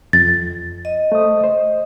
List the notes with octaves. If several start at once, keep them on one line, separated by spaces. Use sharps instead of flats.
F2 A6
D#5
A3 C5 D#6
C5